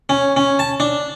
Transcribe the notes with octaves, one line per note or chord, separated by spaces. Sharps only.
C#4
C#4
A5
D4